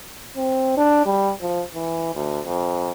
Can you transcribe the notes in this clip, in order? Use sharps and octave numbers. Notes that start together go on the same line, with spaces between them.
C4
D4
G3
F3
E3
D2
F2